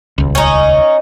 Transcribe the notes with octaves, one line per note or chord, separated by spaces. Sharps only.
D#1 C#2
C#4 D#4